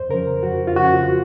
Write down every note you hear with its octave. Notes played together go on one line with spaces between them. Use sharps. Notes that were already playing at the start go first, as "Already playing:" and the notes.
Already playing: F2 C5
C#3 F3 A#4
F2 F#4
F4
C#3 F3 F#4